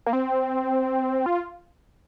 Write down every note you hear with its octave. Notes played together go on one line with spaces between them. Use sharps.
A#3
C4
F4